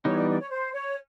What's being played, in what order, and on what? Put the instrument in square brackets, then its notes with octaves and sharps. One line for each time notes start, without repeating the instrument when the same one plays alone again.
[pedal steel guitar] E3 G3 B3 D#4 [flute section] C#5
[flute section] D5
D5
C#5
C5
C#5